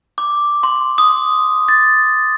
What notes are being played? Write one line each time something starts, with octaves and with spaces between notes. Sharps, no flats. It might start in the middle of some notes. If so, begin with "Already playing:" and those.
D6
C6
D#6
A6